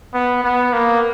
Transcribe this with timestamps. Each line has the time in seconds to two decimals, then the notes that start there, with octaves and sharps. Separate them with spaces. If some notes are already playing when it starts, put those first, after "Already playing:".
0.14 B3
0.44 B3
0.73 A#3